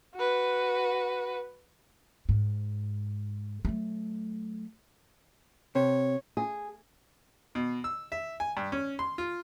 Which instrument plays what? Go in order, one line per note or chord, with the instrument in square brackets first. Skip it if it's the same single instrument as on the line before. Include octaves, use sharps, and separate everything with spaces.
[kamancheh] F#4 B4
[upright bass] G#2
F#3 A3
[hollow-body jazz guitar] C3 [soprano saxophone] C#5
[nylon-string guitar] G#4
[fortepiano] B2
E6
E5
G#5
G2
C#4
C6
F4